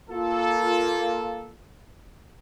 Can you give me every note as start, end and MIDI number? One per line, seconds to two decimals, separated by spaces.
0.10 1.53 58
0.10 1.53 65
0.10 1.53 69